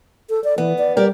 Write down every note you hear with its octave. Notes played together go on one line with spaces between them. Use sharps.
A4
D5
E3 B3
D5
G3 G4 A#4 D5